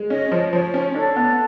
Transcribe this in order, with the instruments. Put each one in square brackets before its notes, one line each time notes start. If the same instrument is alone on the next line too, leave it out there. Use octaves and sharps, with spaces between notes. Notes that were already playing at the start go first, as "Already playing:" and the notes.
Already playing: [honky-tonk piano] G#3
[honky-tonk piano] C#4 [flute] D#5
[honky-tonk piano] F3
[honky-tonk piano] F3 [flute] C#5
[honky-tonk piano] C#4
[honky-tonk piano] D4 [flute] A4
[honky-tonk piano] B3